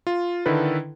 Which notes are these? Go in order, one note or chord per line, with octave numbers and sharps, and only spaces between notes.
F4
D3 D#3 E4 A4 B4